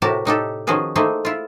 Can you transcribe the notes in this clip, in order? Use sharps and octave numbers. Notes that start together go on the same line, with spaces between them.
A2 C3 F#4 G4 A#4 A5
A2 D#4 G4 A4
D#3 F3 C#4 F#4 G#4 B4
A3 A#3 C4 D#4 E4 G#4
E4 F4